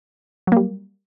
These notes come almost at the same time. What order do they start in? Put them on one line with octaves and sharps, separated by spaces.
F#3 A#3 G3